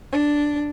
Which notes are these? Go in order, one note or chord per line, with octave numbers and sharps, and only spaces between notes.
D4